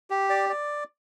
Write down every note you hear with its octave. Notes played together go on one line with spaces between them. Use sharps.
G4
D5
D5